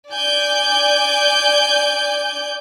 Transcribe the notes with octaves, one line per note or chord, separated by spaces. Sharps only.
D5 G#5 G6